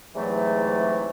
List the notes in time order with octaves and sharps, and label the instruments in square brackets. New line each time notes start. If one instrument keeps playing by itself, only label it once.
[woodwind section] E2 G#2 C3 E3 F#3 A3